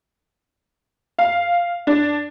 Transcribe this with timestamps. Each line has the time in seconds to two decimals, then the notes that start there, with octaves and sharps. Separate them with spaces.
1.19 F5
1.87 D4